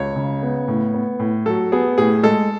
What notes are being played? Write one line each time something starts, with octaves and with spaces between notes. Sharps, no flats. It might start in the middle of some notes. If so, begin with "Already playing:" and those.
Already playing: C#2 C#5
C#3
B3
A2
B3
A2
F#3 A4
B3 G#4
A2 G#4
G#3 A4